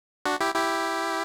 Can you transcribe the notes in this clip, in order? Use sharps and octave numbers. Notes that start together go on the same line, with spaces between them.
D4 F#4
E4 G4
E4 G4